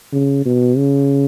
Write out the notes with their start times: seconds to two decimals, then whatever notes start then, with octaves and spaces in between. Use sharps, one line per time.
0.13 C#3
0.45 B2
0.77 C#3